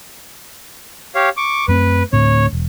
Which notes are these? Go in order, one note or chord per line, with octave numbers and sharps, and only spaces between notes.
G4 C#5 F5
C#6 D6
F#2 A3 C4 B4
D2 A2 C4 C#5
E1